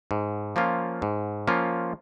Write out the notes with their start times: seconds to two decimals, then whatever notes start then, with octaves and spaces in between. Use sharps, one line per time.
0.11 G#2
0.56 F3 A#3 C#4 F4
1.02 G#2
1.47 F3 A#3 C#4 F4